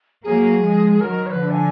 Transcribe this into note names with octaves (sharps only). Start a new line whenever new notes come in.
F#3 A#3 G#4
F3 G#3
D#3 F#3 A#4
C#5
B4
D3 F3
G#5